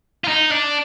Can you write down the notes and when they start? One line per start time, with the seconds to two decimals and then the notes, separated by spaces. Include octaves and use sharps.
0.24 F4
0.28 D#4
0.51 D4